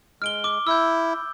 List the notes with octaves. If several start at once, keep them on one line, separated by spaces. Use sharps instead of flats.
G#3 F6 D7 G7
D6
E4 E6 G6